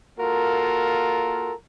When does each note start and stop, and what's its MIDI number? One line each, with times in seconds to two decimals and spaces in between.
0.20 1.52 58
0.20 1.52 65
0.20 1.52 66
0.20 1.52 69
0.20 1.52 70